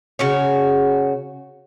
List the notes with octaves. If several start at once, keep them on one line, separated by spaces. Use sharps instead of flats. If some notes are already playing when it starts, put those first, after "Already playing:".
C#3 F#4 C#5